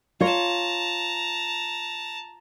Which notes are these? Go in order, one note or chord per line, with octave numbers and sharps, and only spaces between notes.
F4 C#5 A5 A#5